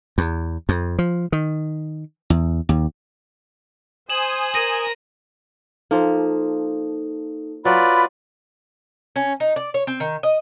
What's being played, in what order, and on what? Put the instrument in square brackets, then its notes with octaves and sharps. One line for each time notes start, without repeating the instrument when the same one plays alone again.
[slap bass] E2
F2
F3
D#3
E2
D#2
[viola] C5 [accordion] G#5 D#6 [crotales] E7 F#7
[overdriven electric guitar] A#4 [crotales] A#6 D#7
[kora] F3 A#3 [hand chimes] D#4 A4
[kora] F#3 [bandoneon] F4 B4 D5 [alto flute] B5
[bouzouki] C#4
D#4
D5
C#5
C4
D#3
D#5